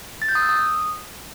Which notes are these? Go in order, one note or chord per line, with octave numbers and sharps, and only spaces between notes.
A6
G6
D#6
E6
D#6